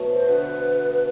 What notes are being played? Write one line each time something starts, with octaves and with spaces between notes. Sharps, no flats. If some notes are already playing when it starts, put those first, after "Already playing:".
Already playing: B2 F#3 A3
C5
D3 F#3 B3 B4